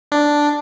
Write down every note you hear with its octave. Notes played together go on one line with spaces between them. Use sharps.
D4